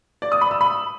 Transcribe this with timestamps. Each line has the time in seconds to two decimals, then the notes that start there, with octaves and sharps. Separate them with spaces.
0.22 D5
0.32 D#6
0.41 B5
0.51 E6
0.61 B5